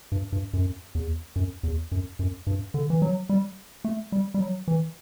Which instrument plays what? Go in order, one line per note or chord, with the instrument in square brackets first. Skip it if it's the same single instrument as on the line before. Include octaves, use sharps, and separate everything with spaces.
[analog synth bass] G2
G2
F#2
E2
F#2
E2
F#2
F#2
G2
D3
E3
F#3
G3
A3
G3
G3
F#3
E3